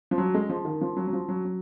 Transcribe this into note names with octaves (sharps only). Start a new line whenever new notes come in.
F3
F#3
G#3
F3
D#3
F3
F#3
F#3
F3
F#3
F#3